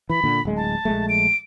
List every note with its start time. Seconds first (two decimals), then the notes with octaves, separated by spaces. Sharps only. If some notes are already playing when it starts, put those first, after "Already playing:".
0.10 E3 B5
0.24 A#2 D3
0.45 D1 G#3
0.56 A5
0.85 A#1 G#3 A3
1.09 D7